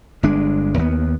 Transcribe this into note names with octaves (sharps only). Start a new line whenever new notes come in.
G1 G#3 D4
D#2 B3